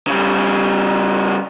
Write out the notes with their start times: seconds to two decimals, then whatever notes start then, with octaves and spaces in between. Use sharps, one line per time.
0.07 C#3 G3